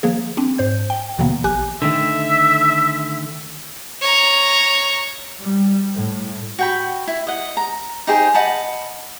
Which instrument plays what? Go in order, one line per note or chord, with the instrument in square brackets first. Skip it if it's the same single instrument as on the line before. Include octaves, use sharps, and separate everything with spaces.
[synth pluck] D#3 F3 A#3 G#4
C4 D4
G#2 C5 G6
G5
D#2 B2 D3 E3 A#3 B3
A#1 G4 G#5 F#6
[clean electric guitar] D3 D#3 A3 [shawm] E5
[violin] C#5 A#5
[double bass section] G3
A2
[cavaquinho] F#4 G5 B5
E4
D#5 F#5
A#5
D#4 G4 G#4 C5
D#5 F#5 A5 B5